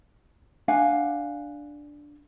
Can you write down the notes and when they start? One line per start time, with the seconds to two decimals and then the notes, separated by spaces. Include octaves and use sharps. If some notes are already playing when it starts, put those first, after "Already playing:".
0.68 D4 F5 F#5 G#5